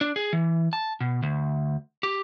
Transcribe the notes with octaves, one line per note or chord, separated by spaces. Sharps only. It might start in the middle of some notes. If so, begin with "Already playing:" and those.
D4
G#4
E3
A5
B2
D2
G4